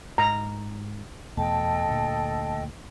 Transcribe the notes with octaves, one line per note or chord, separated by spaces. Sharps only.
G#2 A#5
E2 B2 A3 A4 D#5 G5 A5
D2 A#2